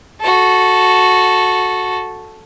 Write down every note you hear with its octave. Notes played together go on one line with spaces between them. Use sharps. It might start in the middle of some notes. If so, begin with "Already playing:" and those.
F#4 A4